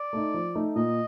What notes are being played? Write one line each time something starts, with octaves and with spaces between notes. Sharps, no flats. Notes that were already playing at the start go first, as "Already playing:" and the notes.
Already playing: D5
A3 D#4
F3
A3 D#4
A#2 D#5